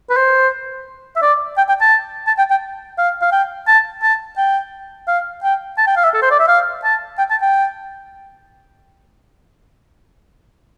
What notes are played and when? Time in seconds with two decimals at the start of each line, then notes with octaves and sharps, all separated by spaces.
0.10 B4
0.17 C5
1.16 E5
1.22 D5
1.58 G5
1.69 G5
1.81 A5
2.27 A5
2.38 G5
2.51 G5
2.98 F5
3.22 F5
3.32 G5
3.68 A5
4.03 A5
4.38 G5
5.08 F5
5.44 G5
5.78 A5
5.87 G5
5.97 F5
6.04 E5
6.14 A4
6.22 C5
6.31 D5
6.40 E5
6.48 F5
6.84 A5
7.19 G5
7.31 A5
7.42 G5